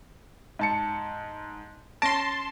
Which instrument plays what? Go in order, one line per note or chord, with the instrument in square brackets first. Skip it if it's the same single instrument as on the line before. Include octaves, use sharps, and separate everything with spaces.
[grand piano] G#2 A5 C#7
[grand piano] C#4 A#6 D7 [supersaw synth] A5 C6